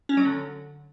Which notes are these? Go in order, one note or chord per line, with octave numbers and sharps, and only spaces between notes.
C#4
F#3
D3